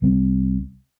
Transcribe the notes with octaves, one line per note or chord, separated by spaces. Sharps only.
C2 C3 G3 C4